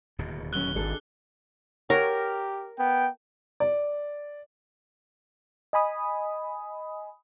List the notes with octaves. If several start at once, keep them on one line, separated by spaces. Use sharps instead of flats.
D1 D#2 B2
F#3 C#4 F#6 G7
G#1 D4 G#4 A4
G4 A#4 C#5 F#5 A#5
B3 G5
D5
D#5 G#5 B5 D#6